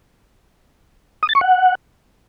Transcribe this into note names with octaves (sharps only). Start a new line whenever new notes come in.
D#6
A6
C#6
F#5